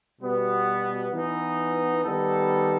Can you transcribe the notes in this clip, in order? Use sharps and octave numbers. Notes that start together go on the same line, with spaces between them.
B2 G3 B3 F#4
E3 B3 D#4
D#3 G3 B3 D#4 A4